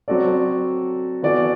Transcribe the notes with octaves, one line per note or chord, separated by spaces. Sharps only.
F#3 C4 F#4 A4 D5
E3 B3 F#4 A4 D5